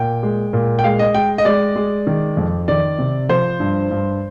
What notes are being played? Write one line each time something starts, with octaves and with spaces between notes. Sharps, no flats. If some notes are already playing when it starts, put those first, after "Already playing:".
Already playing: A#2 G5
G#3
A#2
G5
G#3 F5
D#5
G#3 G5
D#5
G#3 D5
G#3
D#3
F2
D#3 D5
C3
F3 C5
G2
G2